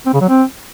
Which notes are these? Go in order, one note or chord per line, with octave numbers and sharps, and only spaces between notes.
C4
C#3
F#3
C4